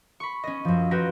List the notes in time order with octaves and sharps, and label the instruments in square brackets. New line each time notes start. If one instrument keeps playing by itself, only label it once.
[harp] B5 C#6
C#4 D#5
F#2 F3
F4 F#4 B4 G5 A#5